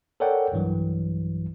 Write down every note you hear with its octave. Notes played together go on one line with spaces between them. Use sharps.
A4 A#4 C#5 D5 F#5 G5
B1 G2 E3 F#3